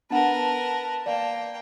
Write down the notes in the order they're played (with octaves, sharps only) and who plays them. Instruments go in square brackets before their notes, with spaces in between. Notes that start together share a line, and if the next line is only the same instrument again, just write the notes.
[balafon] B3 D4 F#5 [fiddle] A#4 B4 [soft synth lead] A5
[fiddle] A#3 G5 [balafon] D5 F5